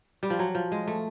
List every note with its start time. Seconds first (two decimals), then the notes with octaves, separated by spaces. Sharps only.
0.23 G3
0.30 F3
0.39 F#3
0.55 F3
0.72 G#3
0.87 A3